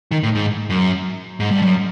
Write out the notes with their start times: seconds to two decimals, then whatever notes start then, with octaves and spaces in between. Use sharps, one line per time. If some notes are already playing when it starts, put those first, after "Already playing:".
0.11 D#3
0.23 A2
0.35 G#2
0.70 F#2
1.40 G#2
1.51 G2
1.62 F#2